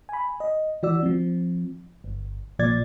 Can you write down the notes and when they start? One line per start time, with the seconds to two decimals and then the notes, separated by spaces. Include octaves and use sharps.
0.09 G#5 B5
0.40 D#5
0.83 E3 F#4 D5 E6
1.03 F3 C4
2.04 G1
2.59 A#1 A#2 F3 D5 G#6 A6